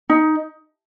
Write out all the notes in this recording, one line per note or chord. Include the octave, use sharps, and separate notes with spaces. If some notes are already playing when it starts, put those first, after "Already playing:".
D#4